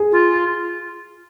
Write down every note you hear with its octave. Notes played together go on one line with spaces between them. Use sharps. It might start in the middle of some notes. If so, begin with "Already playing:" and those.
Already playing: G#4
F4